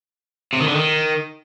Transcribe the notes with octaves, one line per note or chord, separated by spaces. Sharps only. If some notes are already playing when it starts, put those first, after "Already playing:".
C3
D#3
D3
D#3